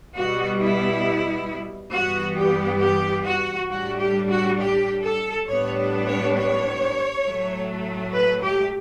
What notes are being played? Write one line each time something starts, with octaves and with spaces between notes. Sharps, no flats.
B2 G3 B3 F#4
E4
G2 E3 G3 B3 F#4
G4
G4
F#4
A2 G3 D4 F#4
G4
F#4
G4
A4
A2 G3 B3 D4 C#5
C#5
C#5
A2 F#3 A3
B4
G4